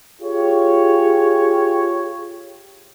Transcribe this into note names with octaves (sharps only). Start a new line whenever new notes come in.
F4 G4 G#4 C#5